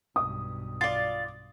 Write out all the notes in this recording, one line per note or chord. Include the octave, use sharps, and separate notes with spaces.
B1 G2 D#6
F4 D5 A6